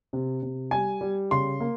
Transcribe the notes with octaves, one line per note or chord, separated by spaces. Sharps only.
C3
C3
G3 G#5
G3
C#3 C6
A#3